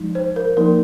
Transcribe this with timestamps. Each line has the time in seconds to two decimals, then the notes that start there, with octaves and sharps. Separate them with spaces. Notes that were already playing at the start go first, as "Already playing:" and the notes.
Already playing: F3 G#3 D#4
0.15 C5
0.36 A#4
0.57 F3 A#3 D#4 A#4